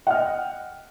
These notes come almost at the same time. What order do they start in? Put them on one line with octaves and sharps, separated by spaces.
F#5 F6 D#5 G5